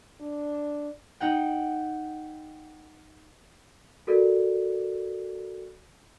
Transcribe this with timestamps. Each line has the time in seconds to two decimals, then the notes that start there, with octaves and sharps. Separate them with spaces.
0.21 D4
1.20 D#4 F#5 G5
4.07 F#4 A4 A#4 D5